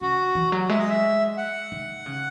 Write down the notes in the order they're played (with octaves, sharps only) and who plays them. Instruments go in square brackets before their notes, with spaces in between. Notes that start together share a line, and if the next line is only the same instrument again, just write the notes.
[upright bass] C#3 [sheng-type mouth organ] F#4
[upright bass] E3
F#3
[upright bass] G#3 [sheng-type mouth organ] E5
[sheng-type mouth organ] D#5
E5
F#5
[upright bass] D#3
C#3